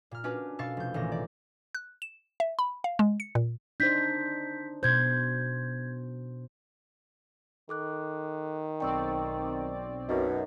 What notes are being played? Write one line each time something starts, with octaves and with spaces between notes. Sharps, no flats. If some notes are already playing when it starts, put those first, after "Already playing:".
A#2 F6
C#4 D4 F#4 B4
B2 A4 F5 C#6 A6
F1 G6
A1 A#2 D#3 A#6
D5
F#6
E7
E5
B5
F5
G#3
C#7
A#2
D4 D#4 C5 G6 B6
B2 C5 G6 G#6
D#3 A4 D6 F#6
B1 C4 D5 G5 C#6 E6
F#2 B2 D#4 B4